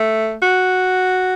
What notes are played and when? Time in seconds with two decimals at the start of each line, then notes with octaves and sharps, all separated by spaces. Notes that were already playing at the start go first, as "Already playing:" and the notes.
Already playing: A3
0.42 F#4